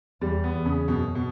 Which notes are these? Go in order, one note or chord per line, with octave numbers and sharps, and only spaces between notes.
E2 G3
B3
E2
C#3
F#2 B2
B2